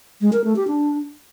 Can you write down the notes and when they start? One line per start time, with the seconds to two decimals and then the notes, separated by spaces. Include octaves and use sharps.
0.21 G#3
0.33 A#4
0.44 A3
0.56 G4
0.67 D4